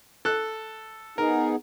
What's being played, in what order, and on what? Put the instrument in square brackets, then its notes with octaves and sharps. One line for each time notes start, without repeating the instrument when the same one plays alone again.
[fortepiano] A4 F#6
[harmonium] B3 D#4 G#4 [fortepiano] A#4